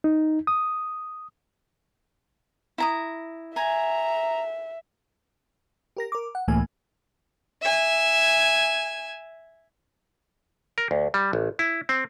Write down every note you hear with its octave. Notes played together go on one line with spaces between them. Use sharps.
D#4
D#6
E4 A#5 D#6
E5 G#5 A#5
G4 A#4 A#6
A#4 D6
F#5
C#2 A2 E3 A3 A#3 G#5
E5 G#5
A#4
D2
G3
A1
E4
C4